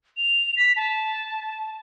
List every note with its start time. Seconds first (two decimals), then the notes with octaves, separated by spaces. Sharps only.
0.17 F7
0.57 B6
0.77 A5